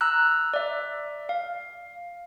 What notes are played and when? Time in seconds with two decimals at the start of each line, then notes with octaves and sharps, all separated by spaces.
0.01 A#5 E6 F#6
0.54 D5 E5
1.29 F5